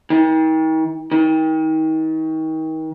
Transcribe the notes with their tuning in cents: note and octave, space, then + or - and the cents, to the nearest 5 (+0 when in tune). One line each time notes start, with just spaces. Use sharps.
D#3 +40
D#3 +35